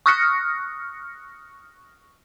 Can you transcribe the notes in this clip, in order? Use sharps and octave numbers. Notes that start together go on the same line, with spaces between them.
C#6 D#6 F6 F#6 A#6 C#7